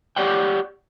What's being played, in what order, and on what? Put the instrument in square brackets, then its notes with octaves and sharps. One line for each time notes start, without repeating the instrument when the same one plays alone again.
[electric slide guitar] G4 C#5 D5 F#5 G5